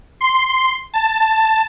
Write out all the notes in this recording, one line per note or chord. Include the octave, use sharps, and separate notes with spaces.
C6
A5